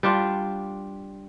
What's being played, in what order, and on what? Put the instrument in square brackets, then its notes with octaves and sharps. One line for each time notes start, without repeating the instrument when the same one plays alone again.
[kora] G3 D4 F4